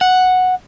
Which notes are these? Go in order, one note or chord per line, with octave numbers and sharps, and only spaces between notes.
F#5